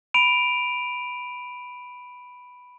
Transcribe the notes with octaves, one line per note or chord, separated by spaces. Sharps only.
B5 D7 D#7 F7